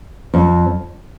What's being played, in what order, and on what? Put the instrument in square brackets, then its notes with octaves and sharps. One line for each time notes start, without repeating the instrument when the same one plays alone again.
[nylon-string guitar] F2